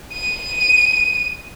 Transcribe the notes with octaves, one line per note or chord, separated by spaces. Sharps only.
D#7